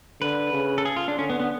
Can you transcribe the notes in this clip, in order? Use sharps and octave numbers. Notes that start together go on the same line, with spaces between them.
D3 B4
C#3
A4
G#4
F4
D4
D3 C#4
B3
B3